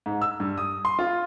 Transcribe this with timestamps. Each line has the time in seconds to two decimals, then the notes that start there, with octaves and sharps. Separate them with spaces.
0.06 G#2
0.22 E6
0.40 G2
0.58 D#6
0.85 C6
0.99 F4